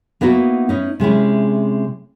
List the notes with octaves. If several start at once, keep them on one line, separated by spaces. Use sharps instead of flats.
A#3 B3 D#4 E4 F#4
C#4 D#4 E4
C3 G#3 C#4 E4